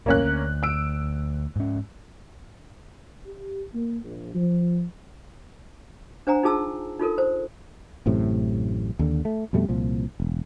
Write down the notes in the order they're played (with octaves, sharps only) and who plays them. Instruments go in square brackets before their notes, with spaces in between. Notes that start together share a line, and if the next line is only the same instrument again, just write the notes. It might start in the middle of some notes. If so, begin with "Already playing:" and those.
[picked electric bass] B1 E2 A2 [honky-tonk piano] A#3 C#4 F#6
[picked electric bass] D2
[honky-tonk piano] E6 D7
[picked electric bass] G#2 C#4
[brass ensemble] G4
A#3
A#1
F3
[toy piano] D4 C5 F#5 G#5 A#5
D#4 F4 G#4 A5 E6
D#4 F4 A4 A#4
C5
[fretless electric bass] A1 F#2 A2 C3
D#2 D3
A3
F2 B2 G3 A3
C2 A#2 F3
E1